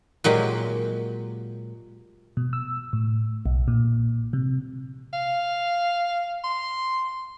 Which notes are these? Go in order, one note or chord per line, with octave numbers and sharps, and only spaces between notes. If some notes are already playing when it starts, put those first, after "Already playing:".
A#2 F#3 G#3 G4
B2
E6
A2
B1
A#2
C3
F5
C6